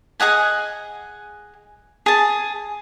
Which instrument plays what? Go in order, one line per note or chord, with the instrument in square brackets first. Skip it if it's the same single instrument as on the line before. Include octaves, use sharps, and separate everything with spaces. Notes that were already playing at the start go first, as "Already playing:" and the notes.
[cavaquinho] G#4 D#5 F#5 G#5
G#4 A5